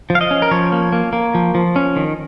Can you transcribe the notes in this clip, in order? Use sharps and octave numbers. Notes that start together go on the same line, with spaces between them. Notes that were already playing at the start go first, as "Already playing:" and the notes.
F3
F5
D#5
C#4
A#4
F3 C#5
A#3
A#3
A#3
F3
F3
C#4
D#3